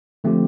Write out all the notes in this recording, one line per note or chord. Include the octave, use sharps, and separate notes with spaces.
D3 F3 A3 C4 G4